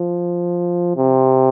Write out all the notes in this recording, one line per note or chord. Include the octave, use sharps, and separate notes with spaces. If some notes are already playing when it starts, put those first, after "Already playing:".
Already playing: F3
C3